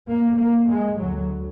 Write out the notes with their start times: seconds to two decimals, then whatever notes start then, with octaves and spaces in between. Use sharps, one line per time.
0.09 A#3
0.39 A#3
0.69 G#3
0.99 D2 F#3